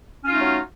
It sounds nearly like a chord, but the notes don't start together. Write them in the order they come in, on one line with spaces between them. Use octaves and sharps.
C#4 F4 D#4 A3 F#3